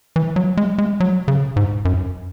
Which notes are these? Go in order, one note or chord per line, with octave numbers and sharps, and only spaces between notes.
E3
F#3
G#3
G#3
F#3
C#3
G#2
F#2